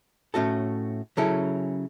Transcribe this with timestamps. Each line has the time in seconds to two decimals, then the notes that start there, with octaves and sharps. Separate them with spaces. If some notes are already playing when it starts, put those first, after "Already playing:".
0.34 A2 A3 C#4 F#4 A4
1.17 C#3 F#3 C#4 E4 A4